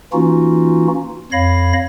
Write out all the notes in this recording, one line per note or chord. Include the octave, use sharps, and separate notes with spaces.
E3 A#3 C#4 D#4 F4 F#4
F2 C#5 F5 B5 A#6